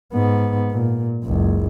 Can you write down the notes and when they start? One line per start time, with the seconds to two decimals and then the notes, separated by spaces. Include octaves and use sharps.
0.14 G#2 B3
0.71 A#2
1.24 F#1 C#2